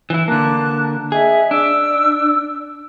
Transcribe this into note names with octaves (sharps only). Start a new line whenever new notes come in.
E3 E4
D3 A#3 A5 D6 F#6
G#4 D#5 E5
D4 E6